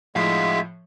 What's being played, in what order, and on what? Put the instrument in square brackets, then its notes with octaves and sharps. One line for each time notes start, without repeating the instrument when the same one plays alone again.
[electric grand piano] A2 F3 [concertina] G#3 E5 [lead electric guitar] E4 F5